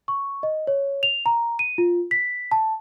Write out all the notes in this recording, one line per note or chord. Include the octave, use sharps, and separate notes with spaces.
C#6
D#5
C#5
F7
A#5
D#7
F4
B6
A5